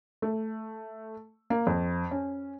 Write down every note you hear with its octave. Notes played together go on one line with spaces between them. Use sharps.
A3
A#3
F2
C#4